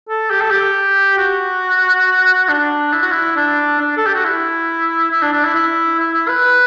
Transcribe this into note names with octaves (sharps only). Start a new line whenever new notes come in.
A4
G4
A4
G4
F#4
D4
E4
F#4
E4
D4
D4
A4
G4
F#4
E4
E4
D4
D4
E4
E4
E4
E4
B4